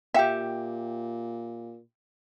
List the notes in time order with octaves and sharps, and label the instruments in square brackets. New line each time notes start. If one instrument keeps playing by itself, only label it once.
[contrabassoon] A#2 [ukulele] G4 E5 [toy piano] F5 G5